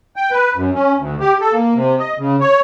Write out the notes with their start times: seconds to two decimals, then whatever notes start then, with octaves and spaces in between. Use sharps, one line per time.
0.16 G5
0.31 B4
0.56 F#2
0.74 C#4
0.97 D2
1.20 G4
1.41 A4
1.53 A#3
1.75 C3
1.99 D#5
2.18 C#3
2.41 C#5